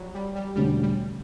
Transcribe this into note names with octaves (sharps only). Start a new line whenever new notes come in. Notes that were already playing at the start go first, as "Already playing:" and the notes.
Already playing: F#3 G3
G3
G3
E1 D2 D3 G3 A3 C#4
G3